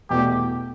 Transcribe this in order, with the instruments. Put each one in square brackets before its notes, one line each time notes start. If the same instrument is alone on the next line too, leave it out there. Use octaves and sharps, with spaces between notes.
[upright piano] E2 B2 A3 [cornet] G4